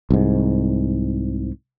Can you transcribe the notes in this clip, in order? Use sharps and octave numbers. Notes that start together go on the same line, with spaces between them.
C2 G#2